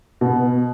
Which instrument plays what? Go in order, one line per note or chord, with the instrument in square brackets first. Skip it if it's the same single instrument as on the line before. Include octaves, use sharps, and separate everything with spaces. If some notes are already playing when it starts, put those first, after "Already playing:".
[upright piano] B2 [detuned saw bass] B3